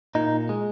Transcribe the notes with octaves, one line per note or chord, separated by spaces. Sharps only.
A#2 D#4
G#3